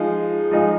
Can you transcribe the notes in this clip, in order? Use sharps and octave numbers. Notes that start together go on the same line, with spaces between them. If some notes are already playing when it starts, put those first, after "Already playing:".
Already playing: F3 G#3 D#4 G#4
F3 G#3 D#4 G#4